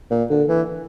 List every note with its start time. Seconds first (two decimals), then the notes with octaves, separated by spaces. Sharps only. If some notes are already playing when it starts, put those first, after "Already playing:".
0.10 A#2
0.30 D3
0.49 E3